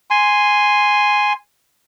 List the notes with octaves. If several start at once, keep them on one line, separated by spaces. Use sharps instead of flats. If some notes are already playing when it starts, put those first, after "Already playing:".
G#5 C6